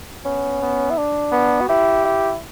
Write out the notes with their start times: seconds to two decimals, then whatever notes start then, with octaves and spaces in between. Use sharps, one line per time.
0.25 B3 C#4
0.61 B3
0.90 E4
0.97 D4
1.32 B3
1.61 F#4
1.69 E4 G4
2.05 E4